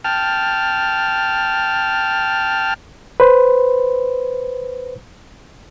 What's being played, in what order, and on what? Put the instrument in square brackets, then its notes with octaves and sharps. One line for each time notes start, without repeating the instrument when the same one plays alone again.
[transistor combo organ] G5 A5 F6
[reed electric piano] B4 C5